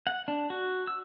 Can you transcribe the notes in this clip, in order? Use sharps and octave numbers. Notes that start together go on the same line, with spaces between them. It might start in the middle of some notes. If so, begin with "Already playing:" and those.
F#5
D4
F#4
E6